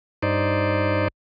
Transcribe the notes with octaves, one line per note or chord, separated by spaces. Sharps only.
G2 D#4 C5 D5